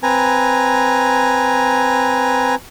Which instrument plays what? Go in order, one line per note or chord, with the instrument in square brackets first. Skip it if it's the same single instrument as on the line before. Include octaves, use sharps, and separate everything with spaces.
[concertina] C4 B4 G#5 A#5